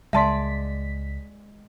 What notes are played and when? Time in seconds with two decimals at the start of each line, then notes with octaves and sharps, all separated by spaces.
0.13 C#2 G#3 D5 E5 A5 C6 B6